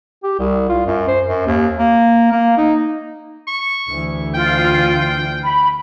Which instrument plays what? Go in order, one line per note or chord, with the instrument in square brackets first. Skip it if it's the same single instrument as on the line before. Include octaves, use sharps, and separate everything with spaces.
[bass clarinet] G4
C2
F4
F#2
C5
F#2
D#2
A#3
A#3
D#4
[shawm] C#6
[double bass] D2 E3
[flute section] F4 [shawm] G5
[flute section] B5